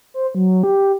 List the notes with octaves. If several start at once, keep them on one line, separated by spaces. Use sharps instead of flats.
C5
F#3
G4